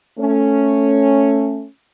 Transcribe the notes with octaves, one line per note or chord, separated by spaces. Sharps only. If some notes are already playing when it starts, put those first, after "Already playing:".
A3 C#4